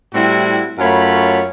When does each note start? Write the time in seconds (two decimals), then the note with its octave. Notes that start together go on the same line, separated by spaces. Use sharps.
0.14 A2 G3 C4 E4 F#4
0.79 F#2 A3 F4 C#5 B5